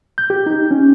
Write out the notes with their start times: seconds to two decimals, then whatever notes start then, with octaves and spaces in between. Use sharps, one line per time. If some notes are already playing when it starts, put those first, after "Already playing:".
0.18 G6
0.30 G4
0.46 D#4
0.71 C#4